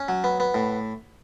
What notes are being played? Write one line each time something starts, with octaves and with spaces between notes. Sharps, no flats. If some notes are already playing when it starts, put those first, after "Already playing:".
Already playing: C#4
F#3
B3
B3
A2